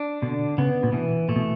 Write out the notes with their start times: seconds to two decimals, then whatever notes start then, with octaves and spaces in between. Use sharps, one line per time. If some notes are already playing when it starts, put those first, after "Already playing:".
Already playing: D4
0.22 B2 D3
0.58 C#3 B3
0.83 A#2
0.92 B2 E3
1.29 A#2 A3
1.36 B2